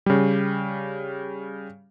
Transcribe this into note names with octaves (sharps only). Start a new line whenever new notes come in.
C#3 G3